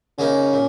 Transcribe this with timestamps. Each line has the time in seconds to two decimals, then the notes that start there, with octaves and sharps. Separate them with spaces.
0.19 C#3 A#3 C#4 D#4
0.53 A#2